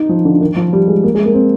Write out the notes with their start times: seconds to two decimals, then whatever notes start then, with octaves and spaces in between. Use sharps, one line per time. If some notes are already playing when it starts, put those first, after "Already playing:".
Already playing: D#4
0.09 F3
0.25 D3
0.41 D#3
0.56 F3
0.73 G3
0.88 G#3
1.04 A#3
1.15 G#3
1.25 A#3
1.34 C4